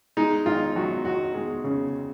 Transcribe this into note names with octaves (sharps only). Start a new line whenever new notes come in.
G#3 D#4
G#1 F4
F#2 F#4
G#1 F#4
G#3
C#3